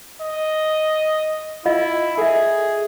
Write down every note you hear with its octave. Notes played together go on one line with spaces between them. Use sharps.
D#5
E4 F4 D#5 F5
G#4 A4 E5